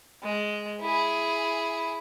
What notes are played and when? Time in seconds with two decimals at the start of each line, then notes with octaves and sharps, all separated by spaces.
0.23 G#3
0.81 E4 G#4